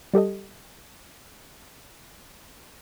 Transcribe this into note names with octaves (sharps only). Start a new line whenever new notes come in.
G3 G4 A4 D#5